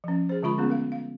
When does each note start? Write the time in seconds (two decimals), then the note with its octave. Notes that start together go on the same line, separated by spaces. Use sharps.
0.04 F3 C#4
0.29 G#4 C5
0.43 D3 G#3 F4 B5 C#6
0.58 A3 B3 C#4 F4 G#4
0.70 A#4 F5
0.92 F5